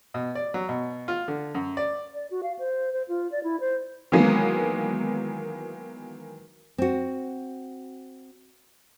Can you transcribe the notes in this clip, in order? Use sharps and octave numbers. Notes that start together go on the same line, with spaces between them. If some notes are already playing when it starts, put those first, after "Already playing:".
B2
D5
F#3
B2
F4
D3
F#2
D5
D5
F#4
F5
C5
C5
F4
D5
E4
C5
D#3 E3 F#3 G#3 A#3 B3
C4 F#4